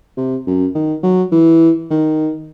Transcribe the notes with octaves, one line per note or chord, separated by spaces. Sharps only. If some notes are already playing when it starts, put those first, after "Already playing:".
C3
F#2
D#3
F#3
E3
D#3